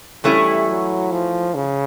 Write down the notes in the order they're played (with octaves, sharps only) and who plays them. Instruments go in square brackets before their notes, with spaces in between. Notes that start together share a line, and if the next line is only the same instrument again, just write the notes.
[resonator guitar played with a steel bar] E3 A3 C#4 E4 [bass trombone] G3
[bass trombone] F#3
F3
C#3